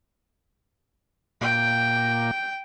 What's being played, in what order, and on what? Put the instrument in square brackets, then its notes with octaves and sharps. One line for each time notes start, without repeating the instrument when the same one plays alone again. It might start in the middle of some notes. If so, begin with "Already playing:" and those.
[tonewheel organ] A#2 A#3 [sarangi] G5